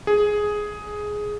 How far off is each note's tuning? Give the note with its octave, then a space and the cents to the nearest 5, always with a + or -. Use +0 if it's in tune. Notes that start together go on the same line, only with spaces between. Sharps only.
G#4 +5